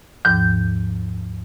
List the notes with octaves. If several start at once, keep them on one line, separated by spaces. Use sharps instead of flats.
D#2 G#2 F3 G6